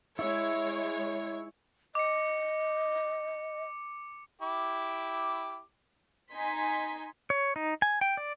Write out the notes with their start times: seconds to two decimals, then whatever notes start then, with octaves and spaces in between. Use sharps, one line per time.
0.19 G#3 E4 C#5
1.95 D#5 D6 C#7
4.42 E4 G4 D6
6.32 D#4 G#5 C6 B6
7.30 C#5
7.56 D#4
7.82 G#5
8.01 G5
8.17 D5